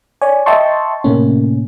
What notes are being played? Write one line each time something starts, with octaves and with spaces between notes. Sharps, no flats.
C#5 D5 G#5
D#5 E5 G5 A5 C6 C#6
A2 C3 A3 A#3 C#4